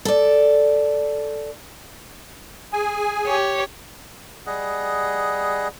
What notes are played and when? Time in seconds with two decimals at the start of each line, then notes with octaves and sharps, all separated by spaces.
0.05 A4 D5
2.73 G#4 G#5
3.26 G4 C#5
4.46 G3 G#4 D#5 F#5